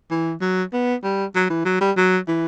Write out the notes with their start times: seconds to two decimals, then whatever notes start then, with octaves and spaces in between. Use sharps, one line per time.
0.11 E3
0.41 F#3
0.73 B3
1.03 G3
1.35 F#3
1.49 E3
1.65 F#3
1.80 G3
1.97 F#3
2.27 E3